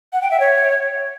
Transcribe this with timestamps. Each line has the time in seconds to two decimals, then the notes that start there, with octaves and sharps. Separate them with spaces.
0.13 F#5
0.22 G5
0.31 E5
0.40 C#5